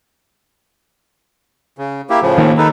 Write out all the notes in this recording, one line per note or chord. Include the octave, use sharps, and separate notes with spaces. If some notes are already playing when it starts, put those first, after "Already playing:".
C#3
A#3 E4 G4
A2 C#3 F3
D#3 A#3
D#4 A4 B4